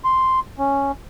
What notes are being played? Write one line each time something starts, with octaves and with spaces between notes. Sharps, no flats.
C6
C#4